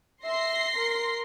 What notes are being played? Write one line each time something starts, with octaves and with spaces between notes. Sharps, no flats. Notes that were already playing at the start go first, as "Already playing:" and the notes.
E5 C6 A#6 C7
A#4